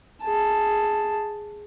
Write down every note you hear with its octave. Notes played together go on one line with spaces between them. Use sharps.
G#4 A5